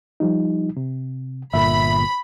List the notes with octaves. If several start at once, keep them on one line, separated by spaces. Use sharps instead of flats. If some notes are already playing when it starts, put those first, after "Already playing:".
F3 G3 D#4
C3
G1 A#2 E5 B5